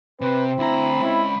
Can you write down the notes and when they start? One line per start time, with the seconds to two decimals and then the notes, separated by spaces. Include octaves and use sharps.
0.21 C3 C4 B4
0.59 D2 E4 A#5 B5
1.02 G#3 C#4 E4